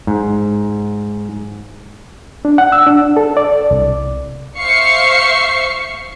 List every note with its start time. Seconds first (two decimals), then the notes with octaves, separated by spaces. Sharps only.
0.07 G#2
2.45 D4
2.58 F#5
2.72 E6
2.87 D4
3.17 A4
3.37 D5
3.71 C2
4.59 C5 E5 F5 C#6 C7 C#7